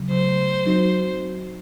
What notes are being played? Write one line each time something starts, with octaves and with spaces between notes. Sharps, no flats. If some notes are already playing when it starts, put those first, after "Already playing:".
Already playing: C#3 F#3
C#3 F#3 A3 C5
F#3 C4 D#4 F#4